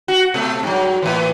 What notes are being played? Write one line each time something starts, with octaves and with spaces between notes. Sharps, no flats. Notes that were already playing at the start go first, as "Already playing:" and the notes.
F#4
B2 A3
G2 F#3
A2 E3